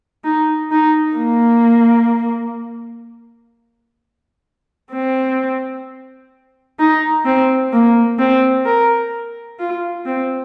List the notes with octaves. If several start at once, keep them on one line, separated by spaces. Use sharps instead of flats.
D#4
D#4
A#3
C4
D#4
C4
A#3
C4
A#4
F4
C4